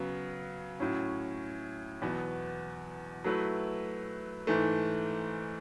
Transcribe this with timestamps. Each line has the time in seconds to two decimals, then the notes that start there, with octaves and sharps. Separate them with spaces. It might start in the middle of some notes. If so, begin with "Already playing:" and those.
Already playing: C#3 F#3 B3
0.80 A2 F#3 C#4
2.02 E2 B2 F#3 B3
3.24 F#3 A3 E4 B4
4.47 G#2 E3 A3